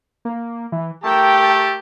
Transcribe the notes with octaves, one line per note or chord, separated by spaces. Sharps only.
A#3
E3
A3 G4 A#4 G5 A5
A5